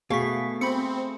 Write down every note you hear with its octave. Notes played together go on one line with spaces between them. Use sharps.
B2 A3 G#4 F5 C#6 B6
C4 B5 C#7